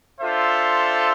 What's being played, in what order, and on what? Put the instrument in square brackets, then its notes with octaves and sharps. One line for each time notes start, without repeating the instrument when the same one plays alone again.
[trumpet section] D4 F4 A4 C5 E5